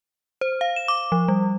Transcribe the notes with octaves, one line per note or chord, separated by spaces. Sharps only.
C5
F5
E7
D6
F3
G3